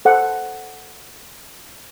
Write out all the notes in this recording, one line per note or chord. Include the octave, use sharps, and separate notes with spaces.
A4 C5 F#5